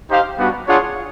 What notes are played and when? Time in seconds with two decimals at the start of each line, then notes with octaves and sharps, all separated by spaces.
0.09 D#4 G4 C5 F5
0.38 G3 B3 D4 F#4
0.67 D4 F4 G#4 C#5 F#5